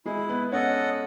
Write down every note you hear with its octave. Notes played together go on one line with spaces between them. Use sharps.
G#3 E4 G#4
B3 B4
C#4 A4 C#5 D#5 F#5